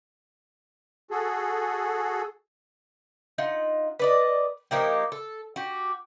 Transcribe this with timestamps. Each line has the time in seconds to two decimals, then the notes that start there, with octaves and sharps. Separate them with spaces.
1.11 F#4 G#4 A4
3.38 D#4 F4 F#5
4.00 B4 D5 D#5
4.71 F3 A#3 D#4 G4
5.12 A4
5.56 F#4 G4